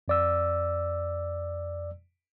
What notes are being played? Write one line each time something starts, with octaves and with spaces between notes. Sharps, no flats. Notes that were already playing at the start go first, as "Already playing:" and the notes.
F2 D5 E6